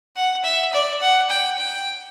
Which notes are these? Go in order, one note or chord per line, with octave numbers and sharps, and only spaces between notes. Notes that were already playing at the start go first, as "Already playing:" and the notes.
F#5
E5
D5
F#5
G5
G5